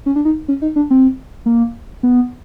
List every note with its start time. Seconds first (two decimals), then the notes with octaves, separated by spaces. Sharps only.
0.06 C#4
0.16 D4
0.25 D#4
0.48 C#4
0.62 D#4
0.76 D4
0.90 C4
1.46 A#3
2.03 B3